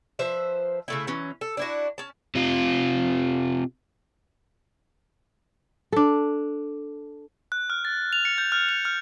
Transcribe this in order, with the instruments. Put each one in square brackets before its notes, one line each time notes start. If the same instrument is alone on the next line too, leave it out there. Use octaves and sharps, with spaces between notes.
[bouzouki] F3 B4 C5 E5
C#3 A3 E4
E3 F#3 C#4
A4
D4 E4 F#4
C#4 A5
[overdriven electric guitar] C3 F4
[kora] D4 A4
[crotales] F#6
F6
A6
F7
C#7
G6
F6
F7
F6